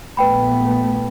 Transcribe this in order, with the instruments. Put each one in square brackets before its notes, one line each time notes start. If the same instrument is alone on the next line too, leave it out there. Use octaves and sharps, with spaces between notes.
[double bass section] A#1 A3 B3 [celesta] B4 G5 B5